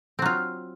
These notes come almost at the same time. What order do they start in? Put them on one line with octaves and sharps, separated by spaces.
C4 F#3 F4